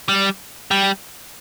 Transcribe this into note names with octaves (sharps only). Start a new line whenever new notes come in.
G3
G3